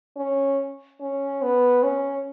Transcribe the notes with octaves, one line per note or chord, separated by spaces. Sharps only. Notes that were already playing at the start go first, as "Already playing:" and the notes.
C#4
C#4
B3
C#4